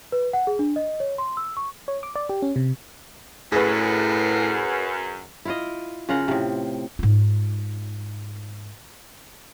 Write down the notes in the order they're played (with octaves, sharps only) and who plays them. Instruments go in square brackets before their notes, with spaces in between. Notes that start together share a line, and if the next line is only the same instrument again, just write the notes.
[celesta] B4
F#5
G#4
D4
D#5
C#5
C6
E6
C#6
[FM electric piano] C#5
D6
D5
G4
C#4
C3
[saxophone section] F#2 [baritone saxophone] A2 [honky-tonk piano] G#4 B4
[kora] E4 F4 D#5
C#3 F4 A#4 F#5
A2 C3
[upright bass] G#2 F4